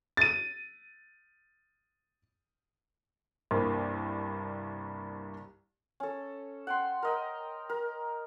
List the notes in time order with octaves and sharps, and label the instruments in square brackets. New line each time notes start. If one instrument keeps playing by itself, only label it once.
[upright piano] A6 D#7
C2 G2 A#3
[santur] C#4 A4
F#5 G5 C6
A#4 D#5 G5
A#4